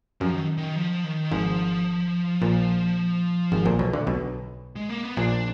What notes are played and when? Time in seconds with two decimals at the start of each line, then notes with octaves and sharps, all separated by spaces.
0.21 F#2 F3
0.33 D#3
0.57 D#3
0.76 F3
1.04 D#3
1.31 G#1 G#2 F3
2.42 A#1 A#2
3.52 G#1 G#2
3.66 A#1 A#2
3.79 B1 B2
3.93 D2 D3
4.07 B1 B2
4.76 G#3
4.89 A#3
5.03 B3
5.17 A#1 A#2 D4